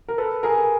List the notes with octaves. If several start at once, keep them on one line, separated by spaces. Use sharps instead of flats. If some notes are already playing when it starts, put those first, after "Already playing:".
A#4
A4 B4
G#4 A#4